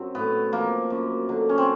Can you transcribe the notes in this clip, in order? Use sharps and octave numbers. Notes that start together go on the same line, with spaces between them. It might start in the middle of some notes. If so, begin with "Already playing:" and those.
Already playing: F#2 F#3 C4
A2 B3
F3 A#3
F#2
D3 F#3
C#4
C4